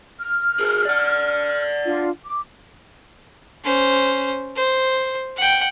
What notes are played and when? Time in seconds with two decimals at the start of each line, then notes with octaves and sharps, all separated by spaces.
0.20 F6
0.60 G#4 A#4
0.85 D5 F#5
1.86 D4 F4
2.25 D6
3.64 C#4 C5
4.56 C5
5.37 F#5 G5